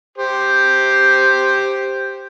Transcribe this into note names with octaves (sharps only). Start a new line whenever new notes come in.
G4 C5